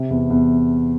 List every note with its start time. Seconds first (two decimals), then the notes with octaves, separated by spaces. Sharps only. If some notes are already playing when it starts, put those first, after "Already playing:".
Already playing: C3
0.10 E2
0.30 E2